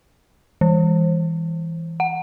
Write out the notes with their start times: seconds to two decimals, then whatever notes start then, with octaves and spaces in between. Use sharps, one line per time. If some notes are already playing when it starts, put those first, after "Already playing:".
0.61 E3
2.00 F#5